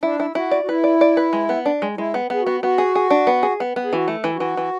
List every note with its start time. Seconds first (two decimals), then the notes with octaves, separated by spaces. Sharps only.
0.03 D4 E4
0.20 E4
0.35 E4 F#4
0.51 D5
0.63 F#4
0.68 E4 B4
0.84 D5
1.01 D5
1.17 B4
1.33 G#3
1.49 B3
1.66 D4
1.82 G#3
1.97 G#3 E4
2.14 B3
2.30 B3 G#4
2.41 F#4
2.46 B3
2.62 B3 F#4
2.78 G#4
2.95 G#4
3.10 D4
3.27 B3
3.43 G#4
3.60 B3
3.76 B3
3.84 G#4
3.93 E3 F#4
4.08 A3
4.24 E3
4.35 F#4
4.40 E3
4.57 E3